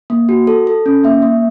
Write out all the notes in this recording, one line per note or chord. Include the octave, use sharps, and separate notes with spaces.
A#3
F#4
A4
A4
C#4
A#3 E5
A#3